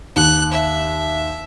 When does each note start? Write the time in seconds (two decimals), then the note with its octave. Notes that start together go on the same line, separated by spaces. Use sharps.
0.16 D#2 F#6
0.52 E5